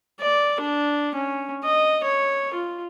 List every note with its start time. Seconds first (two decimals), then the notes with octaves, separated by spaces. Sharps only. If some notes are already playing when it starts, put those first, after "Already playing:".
0.20 D5
0.60 D4
1.15 C#4
1.64 D#5
2.04 C#5
2.54 F4